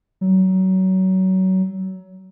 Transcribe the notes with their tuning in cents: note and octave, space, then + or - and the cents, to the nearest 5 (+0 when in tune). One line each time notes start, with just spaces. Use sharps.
F#3 +25